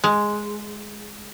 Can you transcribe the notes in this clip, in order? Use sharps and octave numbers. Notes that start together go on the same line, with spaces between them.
G#3